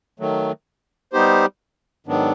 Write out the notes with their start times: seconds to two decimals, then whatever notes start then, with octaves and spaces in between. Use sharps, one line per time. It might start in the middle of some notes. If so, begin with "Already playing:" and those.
0.19 D#3 F#3 A3
1.13 G3 B3 D#4 G4 C5
2.07 G#2 D#3 F#3 B3 D4